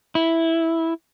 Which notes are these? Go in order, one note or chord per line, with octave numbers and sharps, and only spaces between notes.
E4